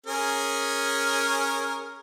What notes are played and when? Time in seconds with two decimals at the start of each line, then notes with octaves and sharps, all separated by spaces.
0.06 C#4 G#4 A#4